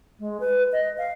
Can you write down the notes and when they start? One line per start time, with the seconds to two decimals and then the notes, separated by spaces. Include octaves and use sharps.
0.19 G#3
0.40 B4
0.72 D#5
0.98 F5